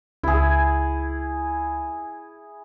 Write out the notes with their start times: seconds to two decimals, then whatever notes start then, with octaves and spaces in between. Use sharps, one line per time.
0.23 C#2 E4 G#4